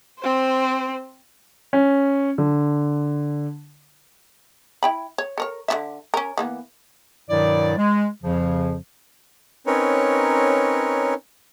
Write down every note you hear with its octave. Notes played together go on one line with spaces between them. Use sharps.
C4 C5
C#4
D3
E4 G5 B5
C#5
A4 A#4 C#5
D3 C#4 E5
C#4 A#4
E3 A#3 B3
G2 B2 D#3 F#3 E4 D5
G#3
F2 C#3 F3
C4 C#4 D#4 A#4 B4 C#5